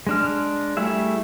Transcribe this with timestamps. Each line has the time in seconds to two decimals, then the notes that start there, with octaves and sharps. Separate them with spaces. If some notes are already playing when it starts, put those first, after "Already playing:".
0.07 G#3 D4 F6
0.77 G3 A3 E4 G#4 E5